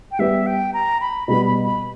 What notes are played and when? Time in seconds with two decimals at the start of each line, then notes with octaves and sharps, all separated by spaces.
0.11 G5
0.19 G3 B3 G4 E5
0.46 G5
0.73 A#5
1.01 B5
1.28 B2 G3 B3 B5
1.46 B5
1.64 B5